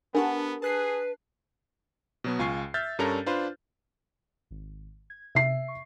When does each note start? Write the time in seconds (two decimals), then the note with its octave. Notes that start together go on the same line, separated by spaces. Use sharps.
0.15 B3 D4 G4 A#4 F#5 A5
0.62 G#4 B4 A5 F#6 C7
2.24 B2 F#3 B3
2.39 C#2 F4 G#5 C#6 C7
2.74 E5 F6 G6 A6
2.99 G2 C#4 D4 A4 A#4 A#5
3.26 D4 F4 B4 C5
4.51 G#1
5.10 G#6
5.35 C3 E5 C7
5.68 C#6